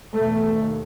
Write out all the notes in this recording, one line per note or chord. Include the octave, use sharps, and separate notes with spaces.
E2 B2 A3
D#2